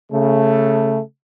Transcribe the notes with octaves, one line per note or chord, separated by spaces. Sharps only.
C#3 A3